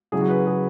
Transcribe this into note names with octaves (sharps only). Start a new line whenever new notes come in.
C#3 F#3 E4 G#4
F#4
B4
G#4